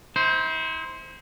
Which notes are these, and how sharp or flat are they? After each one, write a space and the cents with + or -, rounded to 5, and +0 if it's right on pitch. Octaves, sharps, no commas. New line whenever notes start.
E4 -40 C5 +0